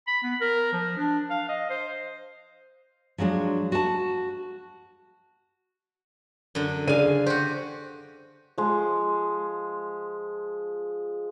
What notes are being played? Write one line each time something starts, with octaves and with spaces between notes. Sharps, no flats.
B5
B3
A#4
F3
D4
F5
D#5
C5
F3 F#3 G#3 D4
F#4 A5
F#2 D3
C#3 G#4 D5 F5 G#5 D#7
F#4 G4 C5
F3 G#3